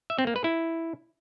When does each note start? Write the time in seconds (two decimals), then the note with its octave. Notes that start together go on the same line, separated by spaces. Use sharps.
0.10 E5
0.19 C4
0.27 A#3
0.36 B4
0.44 E4